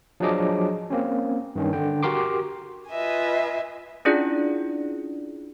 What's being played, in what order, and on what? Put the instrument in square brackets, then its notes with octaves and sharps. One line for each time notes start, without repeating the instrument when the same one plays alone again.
[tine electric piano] F3 F#3 D4 G#4 D#5 D6
A#3 C4 C#4
G2 D#3 C#4
D3 G5
F#4 G4 A#4 C6 D6
[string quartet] F4 B4 D#5 E5 G#5
[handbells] C#4 D4 E4 F4 G#4 D5